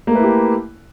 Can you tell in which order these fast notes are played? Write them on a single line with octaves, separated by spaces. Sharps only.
A#3 A3 B4 E4 G4